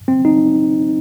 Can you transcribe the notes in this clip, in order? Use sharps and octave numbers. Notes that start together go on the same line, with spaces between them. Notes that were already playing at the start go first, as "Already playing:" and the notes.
C4
D#4